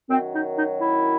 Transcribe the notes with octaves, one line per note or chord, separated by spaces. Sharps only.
F#2 D#3 F#3 C4
D#4
D#4
E4